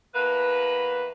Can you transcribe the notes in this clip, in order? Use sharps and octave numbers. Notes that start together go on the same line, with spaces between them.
E2 A#3 B4